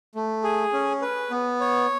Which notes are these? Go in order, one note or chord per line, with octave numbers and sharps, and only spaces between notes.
A3
G#4
C#4
B4
B3
C#5